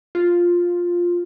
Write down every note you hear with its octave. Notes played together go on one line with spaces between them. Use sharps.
F4